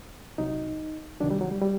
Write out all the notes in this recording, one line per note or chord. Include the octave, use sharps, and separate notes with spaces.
C2 C3 F#3 D#4
C2 C3 D#3 F#3 D4
G3
F#3
G3
G3